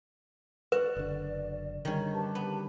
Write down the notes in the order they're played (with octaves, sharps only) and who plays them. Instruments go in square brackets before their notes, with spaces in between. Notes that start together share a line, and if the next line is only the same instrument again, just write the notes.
[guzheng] F#4 [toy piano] B4 [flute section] D5
[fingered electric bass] F#1 D3
[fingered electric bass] D3 G3 [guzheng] D#3 C#4
[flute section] G4 B4 A5
[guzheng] B3